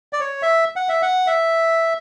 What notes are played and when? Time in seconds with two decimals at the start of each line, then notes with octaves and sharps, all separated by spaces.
0.13 D5
0.20 C#5
0.42 E5
0.76 F#5
0.89 E5
1.02 F#5
1.27 E5